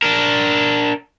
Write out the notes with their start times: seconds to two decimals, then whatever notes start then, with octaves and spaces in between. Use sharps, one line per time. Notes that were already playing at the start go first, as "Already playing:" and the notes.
0.03 D4 A#4